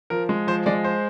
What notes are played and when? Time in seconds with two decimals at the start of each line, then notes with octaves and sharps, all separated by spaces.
0.10 F3 A#4
0.29 G#3
0.47 F3 C5
0.66 G#3 D5
0.84 C5